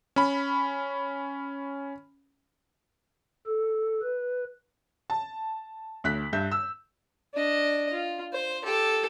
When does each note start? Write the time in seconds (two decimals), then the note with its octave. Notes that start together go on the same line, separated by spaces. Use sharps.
0.16 C#4 B5
3.47 A4
4.02 B4
5.10 A5
6.04 D2 F#6 B6
6.33 G2 E5 G6
6.51 E6
7.34 D4 D#5
7.92 F4
8.33 C5
8.64 G4 A4